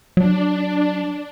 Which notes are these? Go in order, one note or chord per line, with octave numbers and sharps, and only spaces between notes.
F#3 D4